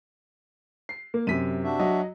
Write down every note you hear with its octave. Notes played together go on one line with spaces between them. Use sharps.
C7
A#3
F#2 C3 B6 D#7
D4 F#4 E5
F#3 D#5